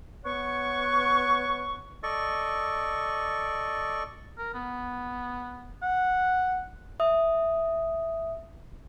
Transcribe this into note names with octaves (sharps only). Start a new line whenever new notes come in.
B3 C#5 F#5 C#6
A4 D5 D#5 C#6
A#4
B3
F#5
E5 D#6